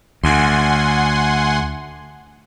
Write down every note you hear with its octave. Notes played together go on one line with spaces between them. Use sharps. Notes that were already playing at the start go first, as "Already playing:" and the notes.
D2 F#5 G#5 C6